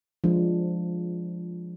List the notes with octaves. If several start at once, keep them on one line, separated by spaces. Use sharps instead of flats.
F3 G#3 D4